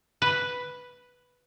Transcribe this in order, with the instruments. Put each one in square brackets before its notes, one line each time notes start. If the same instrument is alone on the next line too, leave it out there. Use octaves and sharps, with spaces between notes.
[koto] B4